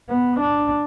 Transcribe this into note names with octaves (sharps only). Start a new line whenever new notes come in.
B3
D4